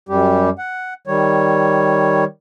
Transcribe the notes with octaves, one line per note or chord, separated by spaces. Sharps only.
F#2 G3 G4
F#5
D#3 G3 C#5